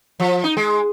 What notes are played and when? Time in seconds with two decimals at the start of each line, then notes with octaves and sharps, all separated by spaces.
0.20 F3
0.44 D#4
0.57 G#3